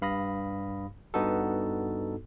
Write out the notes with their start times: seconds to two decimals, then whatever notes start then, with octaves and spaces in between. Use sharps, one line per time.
0.02 G2 F5 B5 D#6 A#6
1.14 G2 B3 D#4 F#4 A4